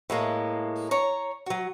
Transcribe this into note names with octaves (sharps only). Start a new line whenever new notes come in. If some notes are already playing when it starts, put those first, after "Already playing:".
A2 G#3 A#3
C#5 A#5
F#3 F#4